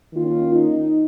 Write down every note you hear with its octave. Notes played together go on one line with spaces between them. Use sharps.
D#3 A#3 C#4 F4
D#4